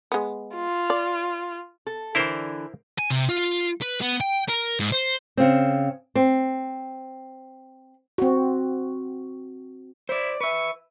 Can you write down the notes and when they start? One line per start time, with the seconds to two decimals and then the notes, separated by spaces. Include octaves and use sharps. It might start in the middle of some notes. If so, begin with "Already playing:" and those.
0.12 G#3 B3
0.55 F4
0.90 D5
1.87 A4
2.15 D3 E3 E4 A#4 C5
2.98 G#5
3.10 C3
3.29 F4
3.81 B4
4.01 B3
4.21 G5
4.49 A#4
4.80 G#2
4.92 C5
5.37 C#3 C4
6.15 C4
8.18 C4 F#4
10.09 E4 C5 D5
10.41 B4 E5 C#6